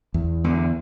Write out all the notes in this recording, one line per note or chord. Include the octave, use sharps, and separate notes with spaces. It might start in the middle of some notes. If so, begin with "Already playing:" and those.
E2
E2 D3